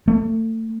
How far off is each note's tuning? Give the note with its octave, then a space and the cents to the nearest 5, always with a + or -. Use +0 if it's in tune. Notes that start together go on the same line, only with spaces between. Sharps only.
A3 +30